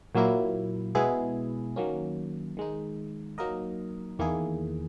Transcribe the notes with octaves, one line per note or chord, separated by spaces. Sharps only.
A#2 F#3 A#3 E4
B2 G#3 B3 E4 G#4
D#3 F#3 A#3 C#4
D#3 G#3 D#4
F#3 A#3 D#4 A#4 D#5
E2 D#3 A#3 E4 G#4